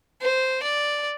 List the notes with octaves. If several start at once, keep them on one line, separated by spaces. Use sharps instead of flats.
C5
D5